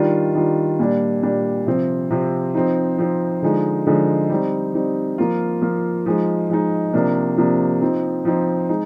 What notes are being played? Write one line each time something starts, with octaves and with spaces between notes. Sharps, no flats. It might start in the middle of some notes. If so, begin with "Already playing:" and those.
Already playing: D#3 G3 D4 F4
D#3 G3 D4 F4
A#2 G3 D4
A#2 G3 D4
C3 F3 C4
C3 F3 C4
F3 C4 D#4
F3 C4 D#4
D3 F3 G#3 D#4
D3 F3 G#3 D#4
G3 C4 D#4
G3 C4 D#4
F3 A#3 F4
F3 A#3 F4
F3 G#3 D#4
F3 G#3 D#4
C3 F3 A#3 D4
C3 F3 A#3 D4
F3 C4 D#4
F3 C4 D#4
G#3 D#4